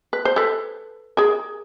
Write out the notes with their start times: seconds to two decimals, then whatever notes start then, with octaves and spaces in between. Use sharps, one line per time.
0.13 B4
0.25 C5
0.36 A4 B4
1.17 G#4 A#4